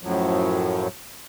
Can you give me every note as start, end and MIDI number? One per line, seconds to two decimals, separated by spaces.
0.03 0.88 42
0.03 0.88 45
0.03 0.88 53
0.03 0.88 54